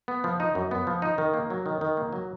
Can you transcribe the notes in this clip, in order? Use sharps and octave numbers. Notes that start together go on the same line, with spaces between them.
B3
F3
D#4
F#2
B3
F3
D#4
D#3
A#3
F#3
D#3
D#3
A#3
F#3